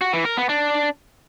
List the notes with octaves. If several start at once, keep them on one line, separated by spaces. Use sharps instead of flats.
F#4
E3
A#4
B3
D4